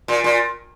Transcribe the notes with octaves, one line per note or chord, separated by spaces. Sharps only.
A#2
A#2